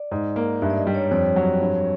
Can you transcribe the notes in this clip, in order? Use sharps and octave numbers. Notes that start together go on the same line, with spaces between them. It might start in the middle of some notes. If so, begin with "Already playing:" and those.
Already playing: D5
G#2
A#3
G2 E5
D5
D#5
G3
C#5
F2 C#5
F#3
G2